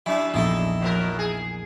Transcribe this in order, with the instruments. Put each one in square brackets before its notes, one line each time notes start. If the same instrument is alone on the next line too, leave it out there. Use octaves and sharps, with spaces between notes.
[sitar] F#3 D4 [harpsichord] E4 E5
[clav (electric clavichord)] A#1 E2 [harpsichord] D#4 E4 A4
[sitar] B2 F3 A#4
G#4